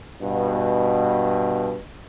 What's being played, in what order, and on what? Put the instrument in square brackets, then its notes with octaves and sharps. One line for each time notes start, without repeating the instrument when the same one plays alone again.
[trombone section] G2 B2